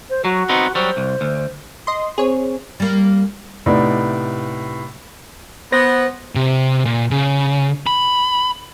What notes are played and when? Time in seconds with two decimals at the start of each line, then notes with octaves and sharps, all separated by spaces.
0.10 C5
0.25 F#3 F#4
0.49 B3 C4 D#4
0.75 F#3 G3 C5
0.97 C2
1.21 D2
1.87 D#5 C6
2.18 C4 G#4 C5 C#5
2.80 G3 A#3
3.66 A2 C3 B3 D#4 D5
5.72 B3 C5 A#6
6.36 C3
6.85 A#2
7.11 C#3
7.87 B5